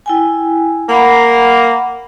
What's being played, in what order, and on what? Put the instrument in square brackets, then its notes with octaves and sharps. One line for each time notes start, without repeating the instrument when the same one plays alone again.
[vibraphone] E4 G5 G#5
[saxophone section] A#3 [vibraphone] F#5 A#5 B5